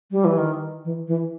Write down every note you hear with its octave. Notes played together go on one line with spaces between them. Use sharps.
G3
E3
D#3
E3
E3